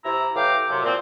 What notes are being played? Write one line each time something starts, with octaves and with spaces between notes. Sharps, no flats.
C3 E4 A#5
A2 E3 G4 F5 G5 D6
F#2 C3
A#2 F3 C4